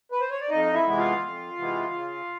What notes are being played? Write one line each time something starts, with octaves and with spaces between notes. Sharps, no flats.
B4
C5
C#5
D5
F2 D#4 D#5
E4 E5
C3 E3 G#3 B3 E5
F4 F5
F2
C3 E3 G#3 B3
C#3